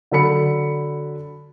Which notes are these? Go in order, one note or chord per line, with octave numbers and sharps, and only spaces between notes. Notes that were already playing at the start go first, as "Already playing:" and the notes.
D3 F#3 A4 B5 C#7